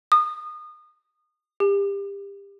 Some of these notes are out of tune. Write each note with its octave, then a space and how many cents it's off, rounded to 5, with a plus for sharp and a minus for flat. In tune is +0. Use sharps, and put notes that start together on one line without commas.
D#6 -30
G4 +30